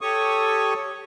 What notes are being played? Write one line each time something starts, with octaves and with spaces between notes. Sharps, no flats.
G4 A4 C#5 C#6 D#6